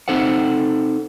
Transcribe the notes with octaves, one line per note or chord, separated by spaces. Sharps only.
C4 D#4 A4 C5 F#5